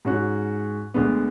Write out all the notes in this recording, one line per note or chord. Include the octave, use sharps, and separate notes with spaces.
G#2 G#3 C#4 F#4
D2 D3 G#3 B3